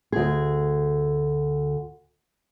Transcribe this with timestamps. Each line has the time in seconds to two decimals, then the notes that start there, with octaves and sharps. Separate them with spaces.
0.12 D2 G#4